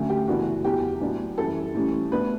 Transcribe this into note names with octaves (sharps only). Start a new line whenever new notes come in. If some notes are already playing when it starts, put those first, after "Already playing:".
Already playing: D2 D3 F#3 A3 C#4
G4
F#2 C#3 E3 B3 D4 F#4
E2 B2 F#3 G4
A2 F#3 B3 D4
F#2 E3 G3 A4
A2 E3 G3 C#4
B2 A3 D4 B4